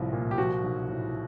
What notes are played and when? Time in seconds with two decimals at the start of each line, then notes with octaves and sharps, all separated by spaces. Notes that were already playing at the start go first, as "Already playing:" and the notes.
Already playing: C2 A2 F3
0.13 A#2
0.31 G4
0.37 F3 F#4
0.63 B1
0.89 A2